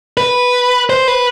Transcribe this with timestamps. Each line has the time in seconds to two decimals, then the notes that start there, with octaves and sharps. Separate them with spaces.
0.17 B4
0.90 C5
1.08 B4